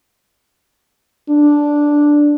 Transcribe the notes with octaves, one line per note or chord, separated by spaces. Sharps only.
D4